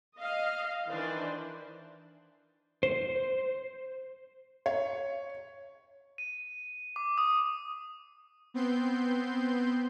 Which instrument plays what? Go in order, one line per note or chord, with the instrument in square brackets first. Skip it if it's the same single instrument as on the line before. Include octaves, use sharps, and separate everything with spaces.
[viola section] D#5 F5
D#3 E3 D4 B4 C5
[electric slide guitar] C5
[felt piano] C#5
[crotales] D#7
D6
D#6
[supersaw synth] B3 C4 C6 G6